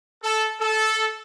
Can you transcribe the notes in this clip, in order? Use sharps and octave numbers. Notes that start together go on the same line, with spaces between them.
A4
A4